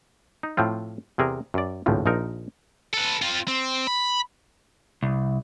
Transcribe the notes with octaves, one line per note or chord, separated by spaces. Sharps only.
D#4
A2 F3 C4 F4
E2 C3 G#4 A#4
F#2 D5
G#1 C#2 A2 F3
A#1 F3 D#4 A#4
A4 B4
C4 F4
C4
B5
C2